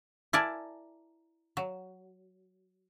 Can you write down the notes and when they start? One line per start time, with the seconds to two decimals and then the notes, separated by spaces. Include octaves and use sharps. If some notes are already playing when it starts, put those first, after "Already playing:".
0.33 E4 A#4 D5 G#5 A5
1.57 F#3